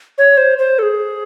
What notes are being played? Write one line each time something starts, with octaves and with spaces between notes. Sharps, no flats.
C#5
C5
C5
A4
G#4